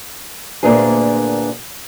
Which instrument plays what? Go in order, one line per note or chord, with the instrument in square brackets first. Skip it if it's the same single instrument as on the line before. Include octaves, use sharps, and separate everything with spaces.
[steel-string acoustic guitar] D2 A#2 A#3 B3 D4 G#4